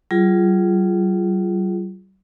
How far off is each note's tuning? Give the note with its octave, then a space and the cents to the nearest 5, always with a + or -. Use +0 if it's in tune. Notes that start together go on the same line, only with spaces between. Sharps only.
G3 -45 F4 -15 G#4 +0